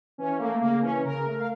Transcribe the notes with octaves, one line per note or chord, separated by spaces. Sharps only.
E3 C#4
A3 A#3
C#3 A#3
E3 C#4
C#3 A#4
A3
F5